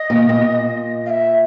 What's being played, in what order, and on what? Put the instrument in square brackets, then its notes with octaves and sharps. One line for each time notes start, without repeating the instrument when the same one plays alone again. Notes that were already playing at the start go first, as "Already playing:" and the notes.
Already playing: [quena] D#5
[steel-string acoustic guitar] A#2
A#2
[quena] F5
E5